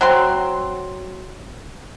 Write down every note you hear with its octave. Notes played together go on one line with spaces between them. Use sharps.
F#3 C4 C6